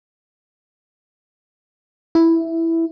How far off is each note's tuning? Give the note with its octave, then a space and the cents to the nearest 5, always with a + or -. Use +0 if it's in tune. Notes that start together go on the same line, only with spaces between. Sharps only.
E4 +0